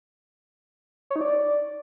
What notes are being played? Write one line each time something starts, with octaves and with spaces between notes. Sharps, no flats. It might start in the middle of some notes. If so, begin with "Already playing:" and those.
C#5
D#4
D5